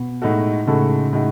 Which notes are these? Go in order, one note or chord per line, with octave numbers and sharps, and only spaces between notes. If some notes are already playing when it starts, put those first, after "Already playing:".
Already playing: B2
A2 G#3 D#4 F#4 A4
A2 C#3 G#3 D#4 F#4 A4
A2 G#3 D#4 F#4